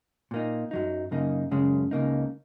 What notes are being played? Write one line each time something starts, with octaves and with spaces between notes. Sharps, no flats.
A#2 A#3 D#4
F#2 F#3 D#4
F#2 C#3 A#3 D#4
F#2 C#3 G#3 C#4
C#2 C#3 A#3 D#4